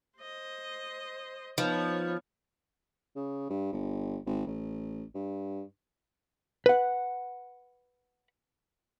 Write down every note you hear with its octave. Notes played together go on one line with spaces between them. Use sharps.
C5 D#5
F3 B3 D#4 B4 C#5 F5
C#3
G2
G1
G#1
A1
G2
B4 F#5